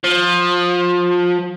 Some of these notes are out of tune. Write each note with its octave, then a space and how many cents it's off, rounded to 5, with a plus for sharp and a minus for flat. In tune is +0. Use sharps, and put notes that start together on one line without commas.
F3 +20